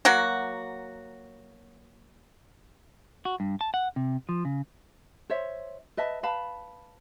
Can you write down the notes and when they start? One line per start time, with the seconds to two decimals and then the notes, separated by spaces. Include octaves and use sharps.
0.05 F#3 A#3 F#4
3.25 F#4
3.40 G2
3.61 A5
3.74 F#5
3.96 C3
4.29 F3
4.45 C#3
5.30 C5 C#5 E5
5.97 B4 D#5 E5 A5
6.23 B4 F5 A5 B5